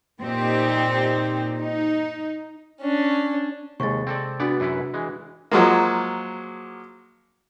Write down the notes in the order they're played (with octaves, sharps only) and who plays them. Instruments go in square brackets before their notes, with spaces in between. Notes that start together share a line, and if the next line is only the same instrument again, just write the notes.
[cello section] A#2 C4 D#4 G4
D#4
[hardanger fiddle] C#4 D4
[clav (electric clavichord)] D#2 [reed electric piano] C3 G#3 [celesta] C#6 A6
[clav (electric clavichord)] C4 A4 D5
[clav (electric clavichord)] B3 D5 [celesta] D4 F#4
[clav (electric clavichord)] F#2 E4 B4
E3 G#3
[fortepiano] F3 F#3 G#3 A#3